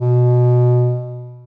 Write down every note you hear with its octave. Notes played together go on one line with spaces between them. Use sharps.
B2